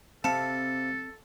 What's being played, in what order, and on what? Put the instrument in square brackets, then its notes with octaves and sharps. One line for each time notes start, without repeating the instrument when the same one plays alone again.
[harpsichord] C3 F5 B5 [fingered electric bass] C4 [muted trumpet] A4 [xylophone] A5 C#7